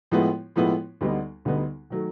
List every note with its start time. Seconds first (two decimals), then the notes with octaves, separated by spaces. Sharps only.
0.11 A2 F3 G#3 B3 E4
0.56 A2 F3 G#3 B3 E4
1.01 D2 D3 G3 B3 D#4
1.45 D2 D3 G3 B3 D#4
1.90 D#3 F#3 A3